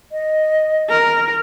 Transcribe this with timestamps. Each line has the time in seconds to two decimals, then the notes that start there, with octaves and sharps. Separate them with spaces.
0.12 D#5
0.89 A#4